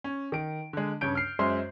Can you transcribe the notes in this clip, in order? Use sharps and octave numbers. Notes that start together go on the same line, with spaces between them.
C#4
D#3 D7
D3 G#3
G2 C#3 C#5 G6 D7
F6 C7
F#2 G#3 C5 E5 C6 F6